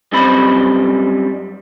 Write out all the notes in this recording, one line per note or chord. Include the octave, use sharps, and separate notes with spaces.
F#2 G3 C4 D#5 B5